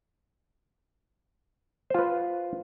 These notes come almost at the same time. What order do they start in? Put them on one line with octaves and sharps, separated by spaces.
C5 F4 B4